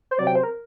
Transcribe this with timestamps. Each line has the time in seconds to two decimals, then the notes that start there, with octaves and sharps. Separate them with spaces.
0.11 C5
0.19 C3 F#3 C4 D5
0.27 G5
0.36 C5
0.43 A#4